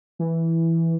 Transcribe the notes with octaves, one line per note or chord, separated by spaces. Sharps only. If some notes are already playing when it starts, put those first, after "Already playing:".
E3